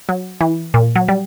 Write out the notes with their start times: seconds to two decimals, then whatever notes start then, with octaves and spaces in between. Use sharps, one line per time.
0.09 F#3
0.41 E3
0.74 A#2
0.96 F#3
1.08 G3